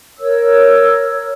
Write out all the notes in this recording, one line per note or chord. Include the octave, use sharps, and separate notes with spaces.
A#4 C#5 E6